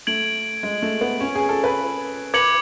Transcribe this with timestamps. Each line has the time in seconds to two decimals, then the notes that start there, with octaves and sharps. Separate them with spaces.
0.07 A3 G#6 D7 F#7
0.63 G#3
0.82 A3
1.01 B3
1.21 C#4
1.35 G#4
1.49 A4
1.64 B4
2.34 B4 D6 G#6 C#7 F#7